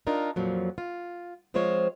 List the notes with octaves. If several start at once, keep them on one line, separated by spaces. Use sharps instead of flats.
D4 D#4 F4 A#4
F2 A#2 F3 F#3
F4
F3 G#3 C4 F4 C5 C#5